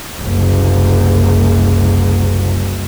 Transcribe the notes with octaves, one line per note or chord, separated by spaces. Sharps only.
F#1 C2